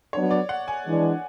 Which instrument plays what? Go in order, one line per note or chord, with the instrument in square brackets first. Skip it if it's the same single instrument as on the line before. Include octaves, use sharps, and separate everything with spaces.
[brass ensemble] F#3 B3 D4 [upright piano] C#5
[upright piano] D5
F#5
G#5
[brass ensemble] E3 G#3 D4